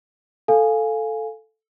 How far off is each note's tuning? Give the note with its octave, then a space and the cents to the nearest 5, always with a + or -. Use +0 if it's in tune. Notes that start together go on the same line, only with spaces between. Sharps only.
A4 +0 F5 +0 G#5 +0